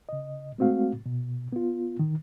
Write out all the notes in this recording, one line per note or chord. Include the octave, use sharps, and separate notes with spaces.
C#3 D#5
G#3 A3 C4 F#4 F5
B2
B3 F4
D#3